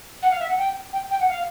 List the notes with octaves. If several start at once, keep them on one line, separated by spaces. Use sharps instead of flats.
F#5
F5
E5
F#5
G5
G5
G5
F#5
F5